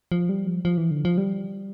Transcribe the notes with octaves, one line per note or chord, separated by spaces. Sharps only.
F3
G3
F3
F3
E3
D3
F3
G3